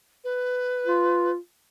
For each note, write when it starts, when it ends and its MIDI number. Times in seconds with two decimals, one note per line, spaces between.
0.24 1.31 71
0.87 1.37 65